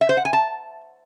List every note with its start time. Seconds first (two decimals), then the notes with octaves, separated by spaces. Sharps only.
0.01 E5
0.09 C5
0.17 F#5
0.25 G#5
0.33 A5